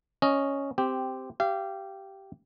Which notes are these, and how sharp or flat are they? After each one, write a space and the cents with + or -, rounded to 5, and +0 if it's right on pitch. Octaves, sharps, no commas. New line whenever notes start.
C#4 +0 D#5 +0
C4 -10 G4 +0
G4 -10 F5 -35